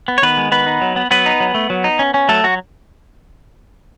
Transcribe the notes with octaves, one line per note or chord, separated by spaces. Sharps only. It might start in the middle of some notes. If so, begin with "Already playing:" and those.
B3
C#5
D#3 B3 B4
G#3
D#3 B3 B4
D#4
F#3
B3
F#3 B3 B4
D#4
F#3
A3
F#3
D#4
C#4
C#4
F#3 A3 A4
F#3 F#4